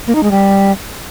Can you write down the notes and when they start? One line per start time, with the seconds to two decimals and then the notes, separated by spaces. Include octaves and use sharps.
0.07 A#3
0.15 D#4
0.23 G#3
0.31 G3